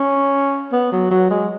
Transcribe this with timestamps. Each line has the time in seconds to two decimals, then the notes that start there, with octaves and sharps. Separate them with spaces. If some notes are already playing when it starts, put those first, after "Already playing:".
Already playing: C#4
0.72 B3
0.92 F#3
1.11 F#3
1.30 G#3